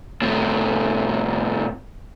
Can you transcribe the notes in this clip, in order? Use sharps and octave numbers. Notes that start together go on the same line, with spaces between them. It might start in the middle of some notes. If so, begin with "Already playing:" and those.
A2 C3